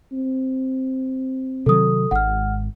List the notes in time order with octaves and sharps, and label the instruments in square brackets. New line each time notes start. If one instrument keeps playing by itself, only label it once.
[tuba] C4
[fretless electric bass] C3 D#3 F#3 [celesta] A4 D#6
[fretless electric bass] G#1 G#2 [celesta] F#5 F6